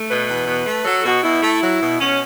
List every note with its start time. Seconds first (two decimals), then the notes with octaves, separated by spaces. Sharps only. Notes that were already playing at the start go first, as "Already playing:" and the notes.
Already playing: A3
0.08 B2 B4
0.28 E2
0.46 B2
0.66 A3
0.85 F#3 A4
1.04 B2 F#4
1.23 B2 E4
1.43 A3
1.61 F#3
1.81 B2
2.00 B2 C#4